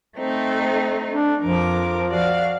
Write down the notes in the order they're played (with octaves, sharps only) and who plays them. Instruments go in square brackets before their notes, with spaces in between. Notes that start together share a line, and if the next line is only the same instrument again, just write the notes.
[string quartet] A3 C4 D#4
[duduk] D4
[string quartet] F2 A#4 D6 [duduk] F3
[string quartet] F#4 D5 F5